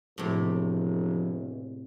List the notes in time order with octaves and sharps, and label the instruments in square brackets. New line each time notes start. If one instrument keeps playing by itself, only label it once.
[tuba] E1 [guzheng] A2 C3 [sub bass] F3